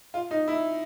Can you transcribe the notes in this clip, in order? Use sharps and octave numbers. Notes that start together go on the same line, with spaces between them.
F4
D#4
E4